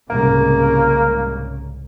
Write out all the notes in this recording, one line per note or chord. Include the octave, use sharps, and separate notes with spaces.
C2 G#2 C#3 A#3